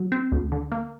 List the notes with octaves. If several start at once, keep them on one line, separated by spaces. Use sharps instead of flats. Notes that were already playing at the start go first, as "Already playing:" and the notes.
Already playing: F#3
C4
D2
D3
A#3